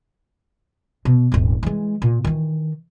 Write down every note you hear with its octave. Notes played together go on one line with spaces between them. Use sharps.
B2
D#1 G#1
E3 G#3
A#2
D#3 E3